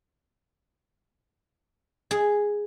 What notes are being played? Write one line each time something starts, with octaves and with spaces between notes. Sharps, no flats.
G#4